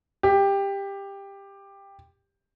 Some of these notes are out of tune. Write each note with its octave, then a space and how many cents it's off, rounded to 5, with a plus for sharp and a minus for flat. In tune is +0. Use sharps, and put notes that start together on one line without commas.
G4 +15